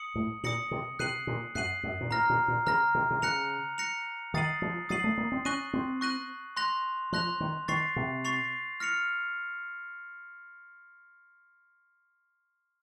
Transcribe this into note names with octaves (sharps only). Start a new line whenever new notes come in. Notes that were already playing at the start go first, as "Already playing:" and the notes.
Already playing: D#6 C#7 F#7
A2
A#2 D#6 A#6 C#7 F#7
C3
C3 F#6 C7 D#7 F#7
A#2
F#2 F#6 C7 D#7 F#7
F#2
A#2
A2 A#5 F6 A#6
A#2
A#2
C#3 A#5 F6 A#6
C3
C3
C#3 F#6 A#6 C#7 F7
F#6 A#6 C#7 F7
D#3 D#6 A6 C7 D#7 F#7
F3
F#3 D#6 A6 C7 D#7 F#7
A3
A#3
C4
C#4 C#6 F#6 A#6 D#7 F#7
C4
C#6 F#6 A#6 D#7 F#7
C6 F#6 A#6 F7
F3 C6 F#6 A#6 F7
D#3
D#3 C#6 A6 C7 F7
C3
C#6 A6 C7 F7
F6 A#6 C#7 F7